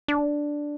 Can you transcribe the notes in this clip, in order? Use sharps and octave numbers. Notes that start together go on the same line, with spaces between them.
D4